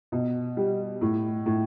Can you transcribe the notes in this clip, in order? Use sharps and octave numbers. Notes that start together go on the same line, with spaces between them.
B2
G3
A2
A2